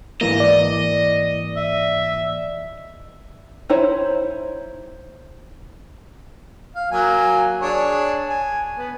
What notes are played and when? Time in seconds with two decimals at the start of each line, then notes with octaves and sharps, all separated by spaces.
0.21 G#2 E3 A#3 D#5
0.40 D5
1.57 E5
3.70 D#4 E4 C5 C#5
6.75 F5
6.92 F#3 A#3 G#5
7.61 D4 G#4 C#5
8.29 G#5
8.77 B3